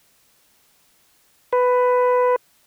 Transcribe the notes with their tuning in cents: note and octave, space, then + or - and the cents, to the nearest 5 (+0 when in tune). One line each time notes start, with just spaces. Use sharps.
B4 +10